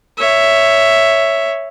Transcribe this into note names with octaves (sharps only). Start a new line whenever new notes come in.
C#5 E5